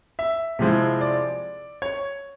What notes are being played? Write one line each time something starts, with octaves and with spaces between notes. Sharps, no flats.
E5
C3 F3 G#3 C4 E4
D5
C#5